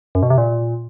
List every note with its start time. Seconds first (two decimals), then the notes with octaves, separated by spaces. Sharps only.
0.15 F#2
0.23 B2
0.30 C3
0.38 A#2